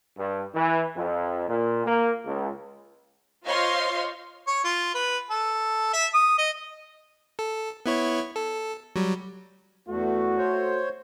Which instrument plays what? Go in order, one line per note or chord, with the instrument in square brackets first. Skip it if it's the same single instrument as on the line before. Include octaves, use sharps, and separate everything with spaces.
[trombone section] G2
E3
F2
A#2
A#3
C#2
[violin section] F4 C5 C#5 D#5 F5 C6
[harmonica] C#5
F4
B4
A4
E5
D#6
D#5
[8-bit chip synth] A4
B3 E4 C#5
A4
F#3 G3
[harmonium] E2 [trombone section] A3 F#4
[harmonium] C5 C#5